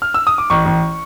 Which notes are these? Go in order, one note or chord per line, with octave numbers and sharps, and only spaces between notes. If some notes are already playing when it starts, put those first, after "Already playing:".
F6
E6
D#6
D6
A1 C#6
A1